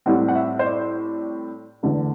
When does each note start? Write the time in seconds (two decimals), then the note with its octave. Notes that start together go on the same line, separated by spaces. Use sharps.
0.06 A2 G3 C4 F#5
0.28 F#5
0.35 E5
0.59 C5
0.65 D5
1.83 E2 D3 A3